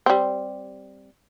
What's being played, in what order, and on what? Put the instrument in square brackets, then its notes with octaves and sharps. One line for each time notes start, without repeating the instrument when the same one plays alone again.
[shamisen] G3 C4